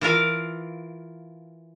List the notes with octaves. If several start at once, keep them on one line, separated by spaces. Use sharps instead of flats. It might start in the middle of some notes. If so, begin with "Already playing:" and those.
E3 F4 A#4 F5